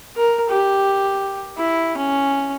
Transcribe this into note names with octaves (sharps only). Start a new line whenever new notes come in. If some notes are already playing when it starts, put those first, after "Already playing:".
A#4
G4
E4
C#4